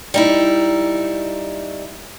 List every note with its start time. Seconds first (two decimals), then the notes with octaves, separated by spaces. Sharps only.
0.14 G3 D#4 E4